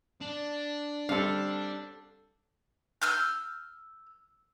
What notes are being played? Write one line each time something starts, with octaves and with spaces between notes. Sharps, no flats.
D4
D3 G3 C4 A4 F5
E6 F6 G6